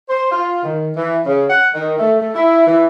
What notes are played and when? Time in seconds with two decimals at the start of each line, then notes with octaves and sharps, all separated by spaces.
0.09 C5
0.31 F4
0.63 D#3
0.96 E3
1.25 C#3
1.50 F#5
1.74 D#3
1.99 A3
2.20 A3
2.35 E4
2.66 E3